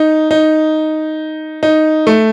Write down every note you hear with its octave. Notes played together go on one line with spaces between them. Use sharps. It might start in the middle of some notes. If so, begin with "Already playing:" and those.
Already playing: D#4
D#4
D#4
A3